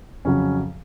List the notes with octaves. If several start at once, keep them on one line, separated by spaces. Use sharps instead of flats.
F2 C#3 F#3 C#4